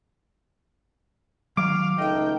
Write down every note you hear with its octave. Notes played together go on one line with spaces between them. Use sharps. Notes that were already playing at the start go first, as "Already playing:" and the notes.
D#3 F#3 F5 D6
C#2 A3 D#4 D#5 E5 G5